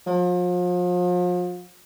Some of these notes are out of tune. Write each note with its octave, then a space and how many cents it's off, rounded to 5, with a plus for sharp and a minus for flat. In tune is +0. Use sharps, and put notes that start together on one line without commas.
F3 +40